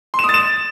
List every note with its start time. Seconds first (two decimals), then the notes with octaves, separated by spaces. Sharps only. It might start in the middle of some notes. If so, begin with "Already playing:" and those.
0.14 C6
0.19 E7
0.24 D#6
0.29 A6
0.34 E7